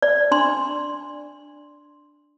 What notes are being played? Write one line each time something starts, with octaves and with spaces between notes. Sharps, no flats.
D5
D4 C6